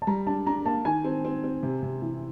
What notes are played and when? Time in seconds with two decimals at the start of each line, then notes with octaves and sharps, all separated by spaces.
0.02 A5
0.07 G3 A#5
0.27 D4 A5
0.46 D4 A#5
0.65 A#3 A5
0.85 D#3 G#5
1.04 C4
1.25 C4
1.44 C4
1.63 C3
1.83 C3
2.02 E3